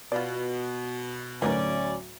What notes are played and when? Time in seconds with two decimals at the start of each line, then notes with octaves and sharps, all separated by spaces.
0.12 B2 F4 D5
1.42 D2 A2 F#3 B3 C#4 D#4 A#4 D5